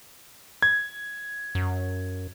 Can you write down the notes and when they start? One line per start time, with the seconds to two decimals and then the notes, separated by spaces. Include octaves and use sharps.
0.62 G#6
1.55 F#2